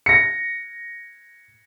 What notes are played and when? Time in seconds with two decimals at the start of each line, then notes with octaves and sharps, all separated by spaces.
0.06 A#6 C#7